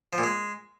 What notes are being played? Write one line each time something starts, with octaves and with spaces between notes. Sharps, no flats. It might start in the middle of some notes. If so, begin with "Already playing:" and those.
F3
A#2
G#3